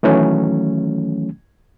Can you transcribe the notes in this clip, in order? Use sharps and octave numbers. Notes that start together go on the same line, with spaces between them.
D#3 E3 F#3 A3 C#4